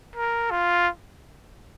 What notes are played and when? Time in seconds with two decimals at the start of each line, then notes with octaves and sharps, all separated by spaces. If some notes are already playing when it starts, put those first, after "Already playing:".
0.16 A#4
0.51 F4